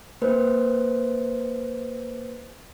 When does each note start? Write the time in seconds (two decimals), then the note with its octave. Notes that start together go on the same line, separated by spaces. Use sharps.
0.22 A#3 B4 C5